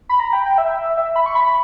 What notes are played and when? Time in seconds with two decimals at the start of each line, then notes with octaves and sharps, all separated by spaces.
0.09 B5
0.20 A#5
0.33 G5
0.46 G5
0.58 E5
0.97 E5
1.16 B5
1.26 C#6
1.35 B5